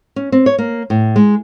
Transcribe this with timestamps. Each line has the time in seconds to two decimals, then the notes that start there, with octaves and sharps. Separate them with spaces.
0.16 C#4
0.32 C4
0.46 C#5
0.58 A#3
0.90 A2
1.16 G#3